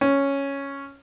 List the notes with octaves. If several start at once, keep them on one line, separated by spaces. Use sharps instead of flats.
C#4